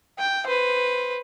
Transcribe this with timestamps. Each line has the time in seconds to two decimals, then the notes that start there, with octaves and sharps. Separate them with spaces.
0.18 G5
0.47 B4 C5